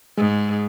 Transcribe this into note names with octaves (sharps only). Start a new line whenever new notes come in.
G#2 G#3